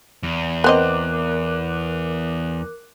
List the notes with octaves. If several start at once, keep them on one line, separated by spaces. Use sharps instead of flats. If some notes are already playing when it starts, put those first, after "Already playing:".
E2
B3 C4 A#4 D#5 D6 F#6